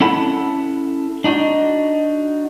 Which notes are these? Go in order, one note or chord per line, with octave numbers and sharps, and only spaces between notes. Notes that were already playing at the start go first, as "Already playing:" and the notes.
C#4 E4 A4 F#5 B5
D4 D#4 F#4